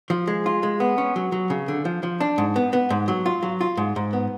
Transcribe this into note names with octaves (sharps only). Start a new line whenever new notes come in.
F3
G#3
F4
G#3
B3
C#4
F#3
F#3
C#3
D3
F3
F3
D4
G#2
B3
B3
G#2
F#3
F4
F#3
F4
G#2
G#2
B3